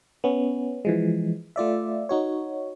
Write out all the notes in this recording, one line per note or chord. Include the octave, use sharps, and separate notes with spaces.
B3 C#4
E3 F3 G#3
A3 F4 D5 E5
D#4 F#4 C#5